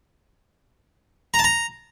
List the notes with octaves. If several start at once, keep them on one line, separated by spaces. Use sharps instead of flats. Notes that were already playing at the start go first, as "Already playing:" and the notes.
A#5
A5
A#5